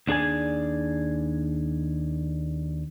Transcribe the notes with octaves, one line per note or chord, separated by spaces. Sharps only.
D#2 D4 G#4 D5 G#5